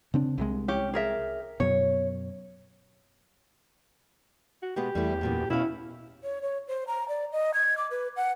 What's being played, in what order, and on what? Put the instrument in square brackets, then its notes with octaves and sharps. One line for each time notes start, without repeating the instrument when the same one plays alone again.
[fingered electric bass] C#3 C4 D4
C2 C3 G#3
[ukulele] C#4 G4
G#4 A#4 E5
[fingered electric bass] F#2 B2 [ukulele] C#5
[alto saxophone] F#4
[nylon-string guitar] B2 G#3 B3 [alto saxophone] G4
[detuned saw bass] E2 [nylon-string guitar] G3 A3 E4
[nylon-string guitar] F#2 A#2 B3
[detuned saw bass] B2 [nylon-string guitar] C#4 F5 [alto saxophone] E4
[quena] C#5
C#5
C5
A#5
D5
D#5
G#6
D6
B4
F#5